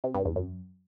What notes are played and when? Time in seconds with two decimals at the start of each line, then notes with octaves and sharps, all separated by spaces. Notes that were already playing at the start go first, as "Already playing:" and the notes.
0.04 C3
0.15 G2
0.25 E2
0.36 F#2